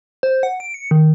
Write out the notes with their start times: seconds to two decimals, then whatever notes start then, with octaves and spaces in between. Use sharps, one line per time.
0.23 C5
0.43 F#5
0.60 D7
0.74 C#7
0.91 D#3